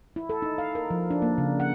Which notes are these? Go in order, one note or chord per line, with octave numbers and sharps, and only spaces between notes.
E4
A4
D#4
F5
A#4
F3
D4
A#3
C#3
F#5